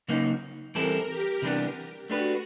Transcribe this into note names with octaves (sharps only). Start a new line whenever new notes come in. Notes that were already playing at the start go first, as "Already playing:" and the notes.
C#3 F#3 A#3 D#4
E3 G3 C4 E4 A4 A#4
G4
C3 E3 G3 B3 D4
A3 D4 F#4 G4 B4